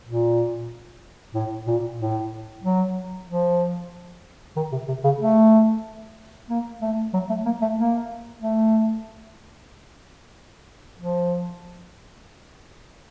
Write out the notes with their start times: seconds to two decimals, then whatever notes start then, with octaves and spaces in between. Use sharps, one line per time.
0.06 A#2
1.34 A2
1.67 A#2
1.99 A2
2.63 F#3
3.27 F3
4.56 D#3
4.72 C3
4.88 C3
5.04 C#3
5.20 A3
6.49 A#3
6.81 A3
7.13 F#3
7.29 A3
7.45 A#3
7.61 A3
7.77 A#3
8.42 A3
10.99 F3